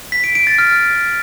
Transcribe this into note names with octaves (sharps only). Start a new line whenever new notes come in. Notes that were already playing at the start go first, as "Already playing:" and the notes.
B6
D7
D7
A6
F6